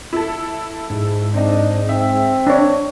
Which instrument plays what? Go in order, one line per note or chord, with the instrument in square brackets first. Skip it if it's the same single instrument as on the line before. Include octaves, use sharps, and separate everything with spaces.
[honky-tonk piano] E4 A4
[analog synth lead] G#2
[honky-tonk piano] C4 D#4 [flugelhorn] D4
[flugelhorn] C4 [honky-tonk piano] E5
[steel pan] D4 C#5